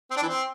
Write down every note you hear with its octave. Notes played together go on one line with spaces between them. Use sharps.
C4
D4
E3
C4